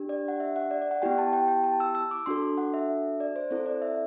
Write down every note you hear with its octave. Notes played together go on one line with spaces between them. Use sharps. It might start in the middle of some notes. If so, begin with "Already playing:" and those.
Already playing: D4 G4
D5
F#5
E5
F#5
D5
D5
F#5
B3 E4 G4 G5
A5
G5
G5
A5
E6
E6
D6
D4 F#4 A4 C6
F#5
E5
D5
C5
C4 E4 A4 C5
D5
E5